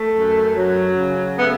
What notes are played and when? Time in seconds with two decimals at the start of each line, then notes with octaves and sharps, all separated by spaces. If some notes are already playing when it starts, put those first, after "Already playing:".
Already playing: A3
0.15 F#2
0.56 F#3
0.98 C#3
1.38 A3 B3